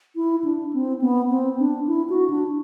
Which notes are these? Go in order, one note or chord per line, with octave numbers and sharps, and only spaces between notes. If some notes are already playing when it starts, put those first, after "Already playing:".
E4
D4
C4
B3
C4
D4
E4
F#4
D4